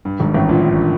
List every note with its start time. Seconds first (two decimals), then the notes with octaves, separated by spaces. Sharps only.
0.05 G2
0.19 G#1 G#2
0.34 A1 A2
0.49 A#1 A#2